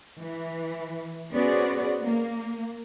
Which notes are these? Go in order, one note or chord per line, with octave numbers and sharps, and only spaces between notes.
E3
B3 C#4 F#4 G#4 C5 D5
A#3